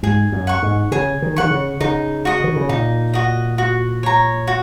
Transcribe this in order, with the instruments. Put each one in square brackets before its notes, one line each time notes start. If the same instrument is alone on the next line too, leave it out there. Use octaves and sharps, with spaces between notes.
[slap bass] G#2 [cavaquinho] G#4
[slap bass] F#2
[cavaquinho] F#5 C#6
[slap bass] G#2
[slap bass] C#3 [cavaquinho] G#4
[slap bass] D#3
[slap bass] D#3 [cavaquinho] F#5 C#6
[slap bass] C#3
[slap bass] C#3 [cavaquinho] D#4
[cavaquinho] F#4 D#5
[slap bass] D#3
C#3
[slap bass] A#2 [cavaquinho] D#4
[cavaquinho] F#4 D#5
F#4
C#5 A#5
F#4